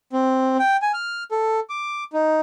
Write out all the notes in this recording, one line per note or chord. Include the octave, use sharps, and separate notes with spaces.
C4
G5
G#5
F6
A4
D6
D#4